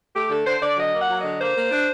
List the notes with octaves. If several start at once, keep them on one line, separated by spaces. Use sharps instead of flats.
A3 G4
D3 A4
D3 C5
D3 D5
F#3 D#5
A#3
F#5
F#3
D3 D#5
A#3 C5
A#3
D4